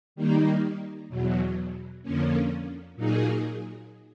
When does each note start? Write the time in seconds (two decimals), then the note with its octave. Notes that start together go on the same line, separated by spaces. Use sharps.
0.16 D#3 G3 A#3 D#4
1.09 E2 B2 F#3
2.03 F2 D3 F3 A#3 C#4
2.96 A#2 F#3 A#3 D#4 G#4